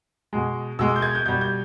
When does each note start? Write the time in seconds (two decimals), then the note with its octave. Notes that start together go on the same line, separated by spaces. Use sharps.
0.33 B2 G#3
0.79 B2 G#3 E6
0.96 G6
1.02 G#6
1.15 G6
1.26 B2 G3 G6
1.41 G6